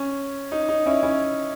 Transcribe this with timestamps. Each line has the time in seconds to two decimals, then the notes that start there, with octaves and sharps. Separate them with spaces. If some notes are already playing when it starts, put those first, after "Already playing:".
Already playing: C#4
0.52 D#4
0.69 D#4
0.86 C#4 E4
1.03 C#4 E4